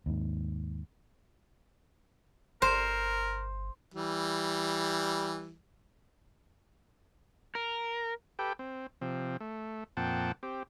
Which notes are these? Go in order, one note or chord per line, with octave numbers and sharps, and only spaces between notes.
D#2 G#2
G1 A#4 C5
E3 G3
A#4
G4 A4 B4 G5
C4
C3 F3 C4
A3
F2 A#2 C4 F#5 G5 A5
C4 G4